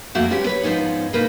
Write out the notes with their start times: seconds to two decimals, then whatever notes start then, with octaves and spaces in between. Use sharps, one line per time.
0.15 F2 A3 A#3 F#4 F#5
0.30 G#3 B3 C#4 G4
0.46 B4 C#5
0.63 G#2 F3 B3 C#4 D#4
1.13 G#2 B2 A#3 D#4 A#4 B4